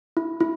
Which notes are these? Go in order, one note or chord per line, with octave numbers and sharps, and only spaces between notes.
E4
E4